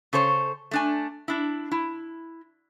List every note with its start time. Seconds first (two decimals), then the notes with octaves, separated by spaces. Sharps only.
0.13 C#3 A4 C5 C#5
0.71 A3 D4 G#5
1.28 D4 E4
1.71 E4